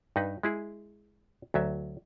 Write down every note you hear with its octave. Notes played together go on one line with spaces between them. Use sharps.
G2 D#4 B4
G#3 E4 G#4
D2 F#3 E5